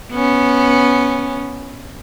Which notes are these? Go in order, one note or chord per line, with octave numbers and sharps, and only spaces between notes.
B3 C#4